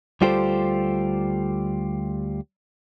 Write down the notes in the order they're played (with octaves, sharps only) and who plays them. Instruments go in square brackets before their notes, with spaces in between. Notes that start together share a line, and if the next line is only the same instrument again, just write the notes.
[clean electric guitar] D2 G3 F4 G4 A4 C5